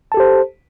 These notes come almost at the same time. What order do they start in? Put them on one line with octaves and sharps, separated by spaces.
A5 A4 G4 C5